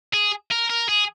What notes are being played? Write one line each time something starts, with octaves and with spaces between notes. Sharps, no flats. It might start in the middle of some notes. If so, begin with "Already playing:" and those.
G#4
A#4
A#4
G#4